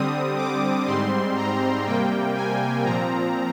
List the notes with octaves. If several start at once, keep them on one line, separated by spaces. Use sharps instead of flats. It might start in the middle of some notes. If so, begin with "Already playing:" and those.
Already playing: D3 G3 C4 D#6
D6
G#2 G3 C4 C6
A#5
C3 G3 A#3 G5
G#5
A#2 F3 C4 A#5